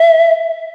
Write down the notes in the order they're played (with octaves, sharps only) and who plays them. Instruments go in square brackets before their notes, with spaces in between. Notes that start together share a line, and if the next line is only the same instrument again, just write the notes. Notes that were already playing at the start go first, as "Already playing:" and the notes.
Already playing: [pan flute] E5